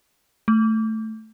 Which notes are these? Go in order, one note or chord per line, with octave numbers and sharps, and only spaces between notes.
A3